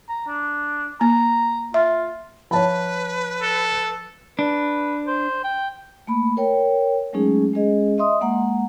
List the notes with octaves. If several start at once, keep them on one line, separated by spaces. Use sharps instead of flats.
A#5
D4
A#3 A#5
F4 E5
F3 B4 C#5 A5 B5
A4
D4 B4
C5
G5
A3 A#3 B5
A#4 C#5 G5
F#3 G#3 A3 C#4 D#4 G#4
G#3 C#4 G#4 D#5
D#5 E5 C6 D#6
G#3 A#3 F#5 A#5